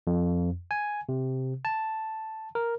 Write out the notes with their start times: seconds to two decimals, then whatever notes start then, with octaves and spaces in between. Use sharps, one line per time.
0.07 F2
0.71 G#5
1.09 C3
1.65 A5
2.55 A#4